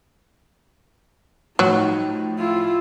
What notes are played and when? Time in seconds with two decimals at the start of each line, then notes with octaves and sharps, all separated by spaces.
1.59 A2 F3 F#3 D#4
2.39 E4 F4